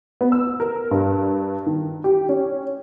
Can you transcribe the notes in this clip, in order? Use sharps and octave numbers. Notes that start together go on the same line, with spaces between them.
B3
E6
A#4
G2
D#3
G4
C#4